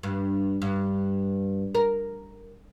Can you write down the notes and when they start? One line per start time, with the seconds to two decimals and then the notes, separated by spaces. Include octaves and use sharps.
0.03 G2
0.62 G2
1.75 A#4